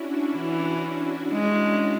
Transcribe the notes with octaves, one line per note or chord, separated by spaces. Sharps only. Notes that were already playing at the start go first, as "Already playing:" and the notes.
Already playing: C#4 D4 E4 F#4
E3
G#3